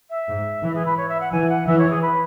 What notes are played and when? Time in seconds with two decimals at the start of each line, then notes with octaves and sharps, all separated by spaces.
0.10 E5
0.28 G#2
0.62 E3
0.74 G#4
0.85 B4
0.97 C#5
1.09 E5
1.20 F#5
1.32 E3 G#5
1.49 F#5
1.66 E3 E5
1.78 C#5
1.90 G#4
2.02 B4